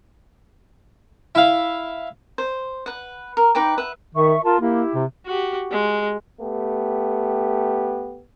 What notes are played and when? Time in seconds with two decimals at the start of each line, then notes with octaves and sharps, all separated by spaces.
1.35 E4 F5
2.38 C5
2.86 B4 F#5
3.37 A#4
3.55 D#4 B4 G5 D6
3.78 B4 E5 F#5
4.15 D#3 E5 C#6
4.44 F4 A#4 A5
4.60 A#3 E4 G4
4.95 C3
5.26 F#4 G4
5.71 G#3
6.40 A3 B3 G4